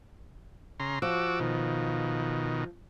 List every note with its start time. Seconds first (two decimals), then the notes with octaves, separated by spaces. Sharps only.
0.80 C#3 A#5 C6
1.02 F3 F#4 D6 E6
1.40 B2 D#3